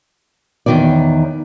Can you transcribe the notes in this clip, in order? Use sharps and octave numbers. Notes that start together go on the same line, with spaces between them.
E2 C3 D#3 C#5 D5